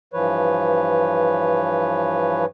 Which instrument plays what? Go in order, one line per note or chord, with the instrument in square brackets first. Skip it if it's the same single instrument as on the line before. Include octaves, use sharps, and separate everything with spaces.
[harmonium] G2 E3 F3 B4 C#5